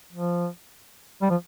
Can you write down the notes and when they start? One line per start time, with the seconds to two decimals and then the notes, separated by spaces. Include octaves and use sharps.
0.13 F3
1.22 G3
1.30 F3